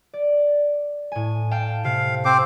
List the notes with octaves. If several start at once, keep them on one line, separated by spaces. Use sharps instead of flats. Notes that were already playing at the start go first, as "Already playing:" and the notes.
D5
A2 G#5
F5 G5 A5
C3 F5
C4 C5 D6